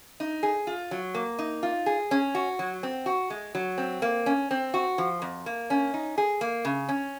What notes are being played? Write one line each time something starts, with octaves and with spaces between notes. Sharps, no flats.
D#4
G#4
F4
F#3
A#3
D#4
F4
G#4
C#4
F#4
F#3
C4
F#4
G#3
F#3
C4
A#3
C#4
C4
F#4
F3
F2
A#3
C#4
D#4
G#4
A#3
C#3
C#4